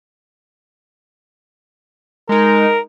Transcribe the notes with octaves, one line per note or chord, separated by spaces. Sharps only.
G#3 D#4 A#4